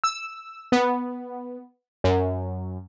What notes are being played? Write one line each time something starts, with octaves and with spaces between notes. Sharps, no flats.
E6
B3
F#2